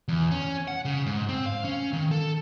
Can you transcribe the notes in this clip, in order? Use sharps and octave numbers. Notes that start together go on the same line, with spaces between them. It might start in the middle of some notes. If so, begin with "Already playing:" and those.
E2
C#4
F#5
C#3
G#2
C4
F5
C#4
D#3
A4